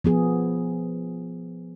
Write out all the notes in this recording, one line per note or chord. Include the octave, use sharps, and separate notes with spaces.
F3 B3 G#4